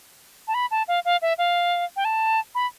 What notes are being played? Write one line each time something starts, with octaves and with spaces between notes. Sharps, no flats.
A5
B5
A5
F5
F5
E5
F5
G5
A5
B5